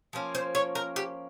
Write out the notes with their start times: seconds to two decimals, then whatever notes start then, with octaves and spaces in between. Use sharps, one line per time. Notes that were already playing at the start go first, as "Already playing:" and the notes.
0.13 F3 A#3 C#4
0.35 C5
0.55 C#5
0.75 A#4
0.96 G4